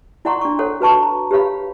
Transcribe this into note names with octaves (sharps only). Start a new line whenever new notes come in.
E4 D5 F#5 A#5 C6 C#6
D4 C#6
A4 C5 C#5 F#5
F#4 B4 A5 C#6
A#5
G4 B4 C#5 F5 B5